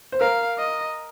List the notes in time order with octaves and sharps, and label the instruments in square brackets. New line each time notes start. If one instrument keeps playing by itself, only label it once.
[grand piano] C5
[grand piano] A#4 [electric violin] F5
[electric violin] D#5